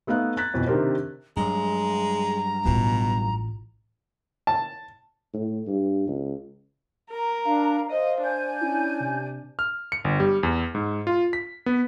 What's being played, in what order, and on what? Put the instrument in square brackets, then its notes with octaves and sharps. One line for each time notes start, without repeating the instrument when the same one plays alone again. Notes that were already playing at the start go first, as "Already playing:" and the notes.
[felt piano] A3 B3 D#4 F5 F#6
A#5 F#6 G#6 A6 B6
F2 B2 E3
C3 D#3 D4 G4 A#4 C5
[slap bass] G2 F#3 [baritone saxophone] G#3 [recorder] A#5
[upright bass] A1 F4 [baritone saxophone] B2
[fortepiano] A5
[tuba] A2
G2
C#2
[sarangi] A#4 [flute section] A#5
[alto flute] D4 [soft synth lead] F5
[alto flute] C5 [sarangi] D#5
[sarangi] D4 [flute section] G#5 G6
[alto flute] C#4 [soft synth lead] E4
[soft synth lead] C3
[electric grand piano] F6
C#7
G1
G3
E2
G#2
F4
B6
B3